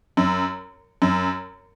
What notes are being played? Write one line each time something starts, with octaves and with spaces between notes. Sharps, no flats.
F#2
F#2